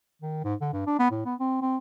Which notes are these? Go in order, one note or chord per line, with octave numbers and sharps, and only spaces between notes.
D#3
G#2
D3
G2
D4
B3
A2
B3
C4
C4